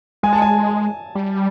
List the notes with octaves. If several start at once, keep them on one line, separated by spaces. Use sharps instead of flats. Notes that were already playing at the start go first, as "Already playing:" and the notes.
G#3 G#5
A5
G#5
G3